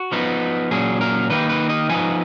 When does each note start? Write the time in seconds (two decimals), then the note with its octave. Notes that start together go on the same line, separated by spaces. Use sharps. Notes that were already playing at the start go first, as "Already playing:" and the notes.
Already playing: F#4
0.12 F3 B3 D#4
0.71 A#2 F#3 C#4 G#4
1.01 A#4
1.30 D#3 A#3 D#4 B4
1.50 B4
1.69 D#5
1.89 F3 B3 D#4 G#5